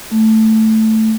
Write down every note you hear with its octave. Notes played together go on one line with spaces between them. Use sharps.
A3